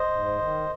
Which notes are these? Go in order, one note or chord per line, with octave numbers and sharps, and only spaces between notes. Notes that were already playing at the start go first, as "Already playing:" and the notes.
Already playing: C5 D#5
G#2
D#3